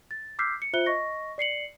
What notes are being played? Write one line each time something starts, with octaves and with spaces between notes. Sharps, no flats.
A6
D6 E6 F6 G6 B6 C7
C#7
F4 C5 E5 F#6 C#7 G7
D#5 C#6 A#6
D5 C7 C#7 F#7